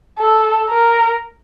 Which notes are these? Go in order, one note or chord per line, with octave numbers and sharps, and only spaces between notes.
A4
A#4